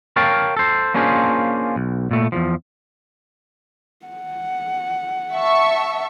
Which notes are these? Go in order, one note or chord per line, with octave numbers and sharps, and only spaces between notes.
A#4 C#5 F5 G5 A5
A4 C5
A#3 C#4 D4 F4 G#4 C5
B1
A#2 A3
E2 G#2 F3
F#5
E5 A5 C#6